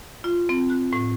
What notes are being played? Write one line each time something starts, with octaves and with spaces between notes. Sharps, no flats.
F4
C4
F#6
A2